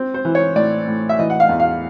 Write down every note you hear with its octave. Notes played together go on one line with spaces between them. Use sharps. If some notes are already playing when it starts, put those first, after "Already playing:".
Already playing: C4
C5
E3
C#5
A2 D5
A2
E5
E3 D#5
F#5
F5
E2
F5